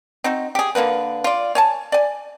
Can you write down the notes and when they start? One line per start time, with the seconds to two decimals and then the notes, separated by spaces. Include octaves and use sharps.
0.24 C4 D#4 F#4
0.55 G4 G#4
0.75 D3 A#3 B3 B4
1.24 F4 D5
1.55 C#5 G#5 A5
1.92 D5 G#5